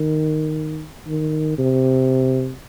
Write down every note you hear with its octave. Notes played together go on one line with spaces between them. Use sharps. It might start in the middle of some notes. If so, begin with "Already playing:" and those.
Already playing: D#3
D#3
C3